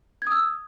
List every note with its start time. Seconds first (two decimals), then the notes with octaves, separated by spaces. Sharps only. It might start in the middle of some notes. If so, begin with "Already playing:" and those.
0.22 G#6
0.27 D#6
0.32 E6